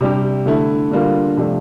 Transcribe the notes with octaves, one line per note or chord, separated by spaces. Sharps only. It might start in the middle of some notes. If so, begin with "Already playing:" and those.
C3 G3 D4 G4
D3 A3 E4
D3 G3 A#3 F4
C3 F3 A3 D4